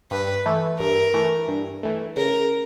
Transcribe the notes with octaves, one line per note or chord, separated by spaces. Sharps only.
G2 B4
E3 A3
G2 A#4
E3 A3
G2
E3 A3
C#3 A#4